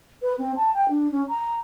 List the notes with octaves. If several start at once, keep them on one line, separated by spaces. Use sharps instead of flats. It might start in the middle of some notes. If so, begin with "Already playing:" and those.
B4
C4
A5
G5
D4
C#4
A#5